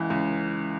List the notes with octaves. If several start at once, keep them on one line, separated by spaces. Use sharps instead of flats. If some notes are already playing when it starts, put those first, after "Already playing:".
Already playing: C#2 E3
C#2